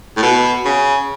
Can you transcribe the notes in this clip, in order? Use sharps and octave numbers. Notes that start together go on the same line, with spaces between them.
A2
B2
C#3